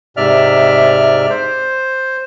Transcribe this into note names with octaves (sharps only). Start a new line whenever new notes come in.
G#2 C3 D5 E5 F6
C5